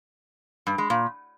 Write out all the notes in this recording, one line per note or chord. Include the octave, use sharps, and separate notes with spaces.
G2
G#3
A#2